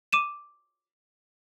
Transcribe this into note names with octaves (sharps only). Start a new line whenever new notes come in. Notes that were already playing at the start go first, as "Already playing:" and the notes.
D6 D#7 E7